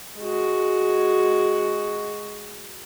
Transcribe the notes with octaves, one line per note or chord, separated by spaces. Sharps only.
G#3 F#4